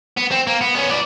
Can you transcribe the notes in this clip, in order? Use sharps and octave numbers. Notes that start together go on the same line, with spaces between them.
B3
C4
A#3
B3
B3 C#4
B3 D5